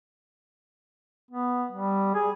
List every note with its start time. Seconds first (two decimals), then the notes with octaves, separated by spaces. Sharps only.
1.31 B3
1.72 G3
2.14 G#4